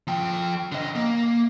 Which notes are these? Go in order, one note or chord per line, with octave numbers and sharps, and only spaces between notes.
F3 G5
D3 D#5
A#3